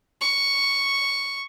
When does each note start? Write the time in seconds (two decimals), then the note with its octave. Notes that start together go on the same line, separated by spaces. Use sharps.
0.21 C#6